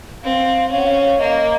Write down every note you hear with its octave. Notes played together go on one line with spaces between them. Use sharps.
C4 F5
C#4 F5
F#5
F5
A#3 D#5